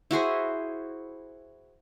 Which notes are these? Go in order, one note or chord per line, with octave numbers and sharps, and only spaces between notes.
E4 F#4 G#4 C5